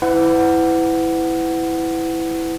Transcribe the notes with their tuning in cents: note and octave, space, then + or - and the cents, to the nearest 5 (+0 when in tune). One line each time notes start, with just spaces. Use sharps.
E4 +0 B4 +40 F#5 +5